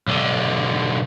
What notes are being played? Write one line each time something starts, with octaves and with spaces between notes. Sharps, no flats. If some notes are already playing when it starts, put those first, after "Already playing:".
B1 D3